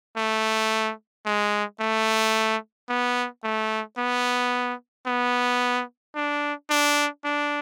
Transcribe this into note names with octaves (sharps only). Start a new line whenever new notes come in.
A3
G#3
A3
B3
A3
B3
B3
D4
D4
D4